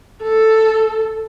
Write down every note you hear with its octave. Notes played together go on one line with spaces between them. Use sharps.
A4